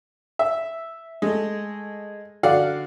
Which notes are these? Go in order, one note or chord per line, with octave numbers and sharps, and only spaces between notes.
E5
G#3 A3
D3 F#4 D5 F5 F#5